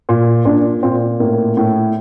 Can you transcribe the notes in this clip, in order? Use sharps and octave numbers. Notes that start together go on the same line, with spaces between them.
A#2
A#2 D4
A#2 C4
A2 A#3
A2